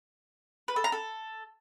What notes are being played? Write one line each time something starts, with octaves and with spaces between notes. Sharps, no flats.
B4
A4
A#5
A4